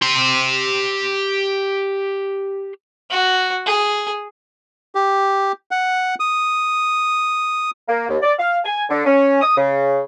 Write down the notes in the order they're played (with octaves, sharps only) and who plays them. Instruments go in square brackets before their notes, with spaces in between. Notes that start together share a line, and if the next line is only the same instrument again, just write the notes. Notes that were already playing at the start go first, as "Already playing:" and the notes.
[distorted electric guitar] G4 C6
[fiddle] F#4
G#4
[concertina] G4
F#5
D#6
[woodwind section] A#3
D#2
D5
F5
G#5
D3
C#4
D#6
C#3